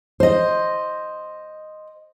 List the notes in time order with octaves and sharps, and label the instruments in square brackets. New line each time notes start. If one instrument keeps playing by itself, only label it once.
[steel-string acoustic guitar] C5 D#5